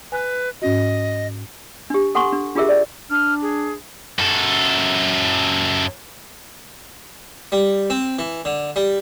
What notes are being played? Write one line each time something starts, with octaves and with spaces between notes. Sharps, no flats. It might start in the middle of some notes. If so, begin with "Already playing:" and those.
B4 G#5 F#6
G#2 C#4 F#4 D#5
D4 G4
A4 F#5 G#5 C6 C#6
D4
D4 F4 G4 G#4 A#4 E5
D5
D4 F6
G#4
F#2 A4
G3
C4
E3
D3
G3